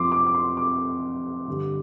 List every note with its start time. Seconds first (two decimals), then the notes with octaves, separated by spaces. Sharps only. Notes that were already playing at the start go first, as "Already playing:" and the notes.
Already playing: F2 F3 C6 D6
0.12 D6
0.27 D6
0.34 C6
0.57 D6
1.48 G2 D3 G3